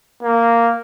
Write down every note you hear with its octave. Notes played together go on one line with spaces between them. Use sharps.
A#3